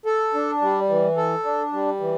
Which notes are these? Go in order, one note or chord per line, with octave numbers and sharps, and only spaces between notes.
A4
D4
G3
E3
A4
D4
G3
E3